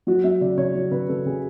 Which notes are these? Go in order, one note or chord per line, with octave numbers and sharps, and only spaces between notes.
F#3 F#4
F#3 E5
C#3 D5
C#3 C#5
F#3
C#3 B4
C#3 A4
C#3 G#4